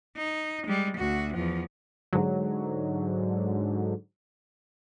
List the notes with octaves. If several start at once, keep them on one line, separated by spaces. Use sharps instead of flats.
D#4
G3 G#3
D2 F#4
E2 F3
G#2 D3 F#3